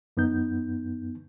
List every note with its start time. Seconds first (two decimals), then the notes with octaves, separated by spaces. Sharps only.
0.17 F#2 B3 D#4 G6